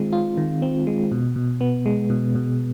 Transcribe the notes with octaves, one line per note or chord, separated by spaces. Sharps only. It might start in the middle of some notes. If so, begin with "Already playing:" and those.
Already playing: D#3 G#3 C4 F4
F4
D#3
C4
G#3
B2
B2
B3
G#3
B2
B2